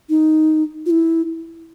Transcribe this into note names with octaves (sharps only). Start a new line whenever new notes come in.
D#4
F4
E4